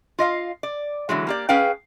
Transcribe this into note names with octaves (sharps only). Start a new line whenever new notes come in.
F4 D#5 F5
D5
D3 E3 F#3 G#3
A#3 G4 D5
C#4 G#4 B4 F5 G5